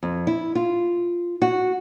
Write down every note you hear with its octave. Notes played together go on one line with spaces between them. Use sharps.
F2
E4
F4
F#4